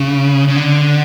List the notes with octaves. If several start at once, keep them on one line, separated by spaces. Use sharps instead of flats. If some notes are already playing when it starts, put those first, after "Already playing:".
Already playing: C#3
C#3
D3